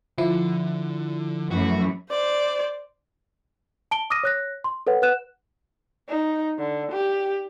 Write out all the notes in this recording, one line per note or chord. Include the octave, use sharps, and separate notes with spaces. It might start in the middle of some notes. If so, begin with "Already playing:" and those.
D3 F3 E4
F#2 E3 A3 F#4
C5 D5
A5 D7 G7
D6 D#6 F6 A#6 D#7
C#5 F#6 A#6
C6
A4 B4 C#5 F#5
B4 F#5 F#6 E7
D#4
D3
G4